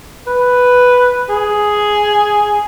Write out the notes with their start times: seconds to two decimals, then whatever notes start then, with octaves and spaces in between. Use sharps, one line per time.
0.27 B4
1.29 G#4